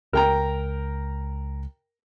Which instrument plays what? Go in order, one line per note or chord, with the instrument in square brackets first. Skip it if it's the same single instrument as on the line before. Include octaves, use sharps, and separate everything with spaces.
[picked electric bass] C#2 [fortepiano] A#4 G5 A#5